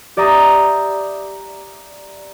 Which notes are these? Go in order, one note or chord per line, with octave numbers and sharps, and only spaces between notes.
G4 D5 E5 A#5 D#6